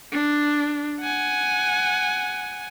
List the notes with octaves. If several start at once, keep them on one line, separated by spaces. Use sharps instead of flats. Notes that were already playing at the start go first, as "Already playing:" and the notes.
D4
F#5 G#5